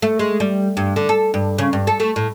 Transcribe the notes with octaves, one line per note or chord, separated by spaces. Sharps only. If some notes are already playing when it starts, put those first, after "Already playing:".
A3
G#3
G3
G2
D3
A4
G2
C#3
G2
A4
A3
A2